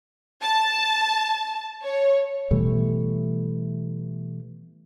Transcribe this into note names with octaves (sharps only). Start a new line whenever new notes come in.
A5
C#5
B2 E3 G3 A3